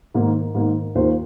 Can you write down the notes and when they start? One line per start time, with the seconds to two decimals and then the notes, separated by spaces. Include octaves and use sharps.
0.14 G#2 D#3 A#3
0.55 G#2 D#3 A#3
0.95 D#2 D#3 A#3 F4 C5